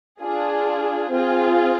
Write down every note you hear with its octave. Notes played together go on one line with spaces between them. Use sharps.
D4 F4 G#4
C4 F4 G#4